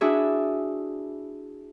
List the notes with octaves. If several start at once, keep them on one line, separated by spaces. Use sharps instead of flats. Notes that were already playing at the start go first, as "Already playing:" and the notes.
D4 E4 F#4 G#4 E5